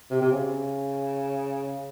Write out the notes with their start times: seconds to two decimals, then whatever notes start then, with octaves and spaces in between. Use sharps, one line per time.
0.11 C3
0.21 C3
0.32 C#3